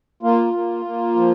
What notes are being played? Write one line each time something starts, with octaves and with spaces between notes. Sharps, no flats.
A#3 F4
A#3
A#3
F3